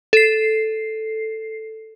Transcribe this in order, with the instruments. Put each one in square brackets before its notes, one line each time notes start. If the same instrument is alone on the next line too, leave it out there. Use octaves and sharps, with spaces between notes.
[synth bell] A4 C7